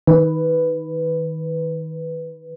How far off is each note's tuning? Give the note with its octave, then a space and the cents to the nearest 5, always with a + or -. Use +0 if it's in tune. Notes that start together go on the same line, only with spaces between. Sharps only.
D#3 +20 B4 +0